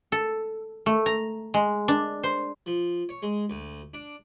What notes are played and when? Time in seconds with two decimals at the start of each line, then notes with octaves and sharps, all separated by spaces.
0.12 A4
0.86 A3
1.06 A#5
1.54 G#3
1.88 D4
2.23 C5
2.66 F3
3.09 C#5
3.22 G#3
3.50 D2
3.94 D4